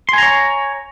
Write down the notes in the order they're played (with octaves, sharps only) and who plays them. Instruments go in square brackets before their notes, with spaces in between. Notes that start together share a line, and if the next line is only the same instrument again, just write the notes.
[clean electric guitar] C6
G#5
A#5
C#5